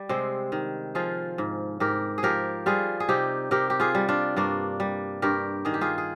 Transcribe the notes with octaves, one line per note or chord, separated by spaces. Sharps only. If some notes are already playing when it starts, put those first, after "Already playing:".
Already playing: G3
C3 G#3 C4
D#3
F3 F4 G#4
G#2
G#2 G4 A#4
G#4
F3 G4 A#4
G3 F4 G#4
G#4
C3 D#4 G4
C3 G4 A#4
G4
F4 G#4
G3
D4 F4
G2 A#3 D4
G3
G2 G4 A#4
D#3 G#4
G4
F4 G#4
G#4